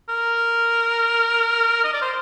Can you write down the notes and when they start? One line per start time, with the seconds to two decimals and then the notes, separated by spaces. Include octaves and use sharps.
0.09 A#4
1.84 D#5
1.94 D5
2.02 C5